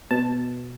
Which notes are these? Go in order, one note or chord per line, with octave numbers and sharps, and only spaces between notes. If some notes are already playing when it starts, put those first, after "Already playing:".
B2 A5